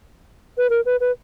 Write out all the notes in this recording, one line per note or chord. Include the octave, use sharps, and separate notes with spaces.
B4
A#4
B4
B4